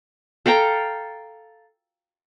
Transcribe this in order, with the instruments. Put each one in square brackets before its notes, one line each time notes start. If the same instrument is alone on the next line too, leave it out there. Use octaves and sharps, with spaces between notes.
[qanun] A4 F5 G5 A#5